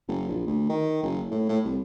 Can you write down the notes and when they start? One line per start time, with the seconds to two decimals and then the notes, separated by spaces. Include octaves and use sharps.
0.08 F#1
0.29 A#1
0.47 D2
0.69 D#3
1.03 F#1
1.31 A2
1.49 A2
1.65 C2